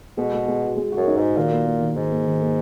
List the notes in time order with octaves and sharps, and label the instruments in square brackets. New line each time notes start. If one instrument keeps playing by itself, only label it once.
[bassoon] B2 [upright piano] G#3
[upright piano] G#3
G#3
F#4
G#3
[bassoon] F#2 [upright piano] F#4
[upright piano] D#4
[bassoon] G#2 [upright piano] F#4
[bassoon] A#2 [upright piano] D#3
[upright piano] A#3
A#3
D#3
[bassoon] G#2 [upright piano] D#3
[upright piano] A#3
D#3
A#3